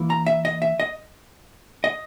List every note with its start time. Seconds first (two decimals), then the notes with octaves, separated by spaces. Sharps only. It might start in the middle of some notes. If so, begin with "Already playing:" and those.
Already playing: E3 A#3 E4
0.10 A#5
0.27 E5
0.45 D#5
0.62 E5
0.80 D#5
1.84 D#5